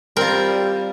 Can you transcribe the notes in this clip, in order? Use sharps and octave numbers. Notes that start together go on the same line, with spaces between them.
G3 C4 F4 A#4